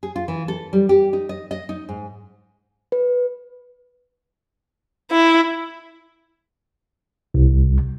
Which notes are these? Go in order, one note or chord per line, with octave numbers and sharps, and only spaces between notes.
G#4
F4
E3
A4
G3
G4
D#4
D#5
D#5
D#4
G#2
B4
E4
C2